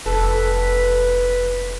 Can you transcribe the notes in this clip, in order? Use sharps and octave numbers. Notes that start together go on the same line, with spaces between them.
F1 A4 B4